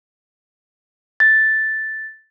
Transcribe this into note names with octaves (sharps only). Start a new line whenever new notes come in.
A6